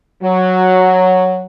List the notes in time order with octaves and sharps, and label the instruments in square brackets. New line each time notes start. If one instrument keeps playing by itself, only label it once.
[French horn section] F#3